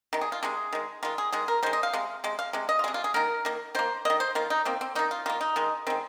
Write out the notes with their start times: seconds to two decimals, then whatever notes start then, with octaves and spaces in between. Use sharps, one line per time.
0.13 C3 D#3
0.21 G#4
0.32 F4
0.43 C3 D#3 G#3 G#4
0.73 D#3 G#3
1.03 D#3 G#3 F4
1.18 G#4
1.32 D#3 G#3 G#4
1.48 A#4
1.63 D#3 C5
1.66 G#3
1.73 D#5
1.83 F5
1.93 C3 G#3
2.24 C3 G#3
2.39 F5
2.53 C3 G#3
2.69 D#5
2.79 F4
2.84 G#3 G#4
2.88 C3
2.94 F4
3.04 G#4
3.14 D#3 A#3 A#4
3.45 D#3 A#3
3.75 D#3 A#3 C5
4.05 D#3 A#3 D#5
4.20 C5
4.35 D#3 A#3 F4
4.50 D#4
4.65 D#3 A#3 C4
4.81 C4
4.95 D#3 A#3 D#4
5.11 F4
5.26 D#3 A#3 F4
5.41 D#4
5.56 D#3 G#3
5.87 D#3 G#3 C4